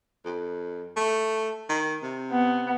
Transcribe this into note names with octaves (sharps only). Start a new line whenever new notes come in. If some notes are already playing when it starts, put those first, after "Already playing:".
F2
A3
D#3
C3
B3